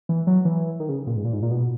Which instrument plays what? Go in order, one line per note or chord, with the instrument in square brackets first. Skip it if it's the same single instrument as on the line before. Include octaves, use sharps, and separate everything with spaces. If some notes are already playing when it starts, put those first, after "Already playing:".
[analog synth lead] E3
F#3
E3
D#3
C#3
A#2
G#2
A#2
G#2
A#2
B2